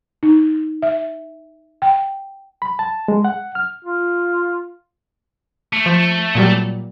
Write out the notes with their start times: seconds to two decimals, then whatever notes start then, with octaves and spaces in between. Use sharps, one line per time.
0.23 D#4
0.82 E5
1.82 G5
2.62 B5
2.79 A5
3.08 G#3
3.25 F#5
3.55 F6
3.84 F4
5.73 A3
5.86 F3
6.35 A#2 F#3 G3